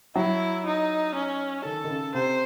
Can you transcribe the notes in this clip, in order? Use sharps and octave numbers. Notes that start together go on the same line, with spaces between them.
F#3 E4
D#4
C#4
D#3 A4
D#3
C#3
C3 C5